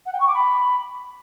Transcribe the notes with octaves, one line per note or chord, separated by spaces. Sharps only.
F#5
G5
C#6
D6
B5